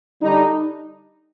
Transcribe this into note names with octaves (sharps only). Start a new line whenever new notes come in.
D3 G3 D4 D#4